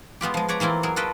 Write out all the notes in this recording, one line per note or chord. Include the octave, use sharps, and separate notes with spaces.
G#3 B3 F4 G4
F3 G#3
B4 C#5 D5 A#5
E3 A#3 C4 E4 F4
F#3 G#4 A#4
F4 F#4 A4 B4 D#5 G5